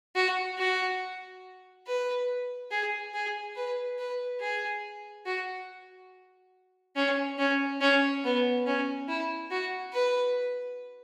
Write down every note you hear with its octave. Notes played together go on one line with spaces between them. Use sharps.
F#4
F#4
B4
G#4
G#4
B4
B4
G#4
F#4
C#4
C#4
C#4
B3
C#4
E4
F#4
B4